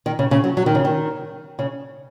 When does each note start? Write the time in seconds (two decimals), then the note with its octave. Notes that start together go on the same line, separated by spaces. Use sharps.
0.06 D#3
0.19 C#3
0.31 C#3
0.44 F#3
0.57 F#3
0.66 D#3
0.75 C#3
0.85 D#3
1.59 C#3